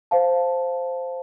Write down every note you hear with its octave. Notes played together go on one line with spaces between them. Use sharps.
C5 F5 A5